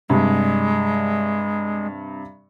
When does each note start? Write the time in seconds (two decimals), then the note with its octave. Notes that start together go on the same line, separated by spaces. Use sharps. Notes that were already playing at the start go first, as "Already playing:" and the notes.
0.10 G2 C3 G3 G#3